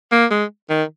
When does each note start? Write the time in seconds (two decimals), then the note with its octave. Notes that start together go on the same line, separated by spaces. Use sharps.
0.12 A#3
0.31 G#3
0.70 D#3